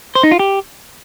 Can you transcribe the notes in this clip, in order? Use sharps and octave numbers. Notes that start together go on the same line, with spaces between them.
C5
D#4
F4
G4